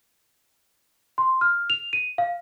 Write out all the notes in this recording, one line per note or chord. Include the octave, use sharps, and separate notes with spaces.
C6
F6
F7
D#7
F5